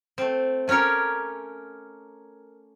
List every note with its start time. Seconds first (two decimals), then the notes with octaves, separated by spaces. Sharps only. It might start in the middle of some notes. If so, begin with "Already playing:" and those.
0.18 A3 C4
0.68 A3 C#4 G4 A#4 C#5